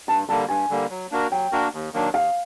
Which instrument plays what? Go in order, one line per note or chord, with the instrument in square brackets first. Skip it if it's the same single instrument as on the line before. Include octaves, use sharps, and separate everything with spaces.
[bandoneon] G2 [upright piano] A5
[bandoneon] D3 G3 A#3 [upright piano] A5
[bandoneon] G2 [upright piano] G#5
[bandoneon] D3 G3 A#3
F#3
A#3 D4 F#4 A#4
[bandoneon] F#3 [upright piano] G5
[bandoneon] A#3 D4 F#4 A#4
D#2
D#3 F#3 A#3 D4
[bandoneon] D#2 [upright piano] F5